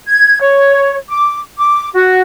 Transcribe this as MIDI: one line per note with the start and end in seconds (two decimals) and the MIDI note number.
0.06 0.39 92
0.40 0.96 73
1.09 1.39 86
1.57 1.89 86
1.93 2.21 66